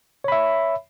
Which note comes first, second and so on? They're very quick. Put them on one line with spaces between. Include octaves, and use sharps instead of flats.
C#5 B5 E5